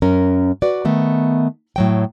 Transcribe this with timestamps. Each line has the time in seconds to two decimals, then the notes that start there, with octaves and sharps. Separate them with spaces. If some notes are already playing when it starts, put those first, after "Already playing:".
0.02 F#2 C#4 A#4
0.62 F#4 B4 D5
0.85 D#3 A3 B3
1.76 A2 F#3 G5